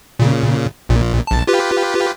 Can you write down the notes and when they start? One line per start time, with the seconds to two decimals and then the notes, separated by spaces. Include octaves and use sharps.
0.19 A#2 C#3
0.89 A#1 A#2
1.27 A#1 A5
1.47 F4 G4 B4